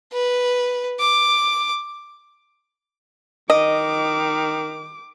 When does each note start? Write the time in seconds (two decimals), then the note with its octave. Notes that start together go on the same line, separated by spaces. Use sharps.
0.13 B4
1.00 D6
3.50 D#3 D#5 D6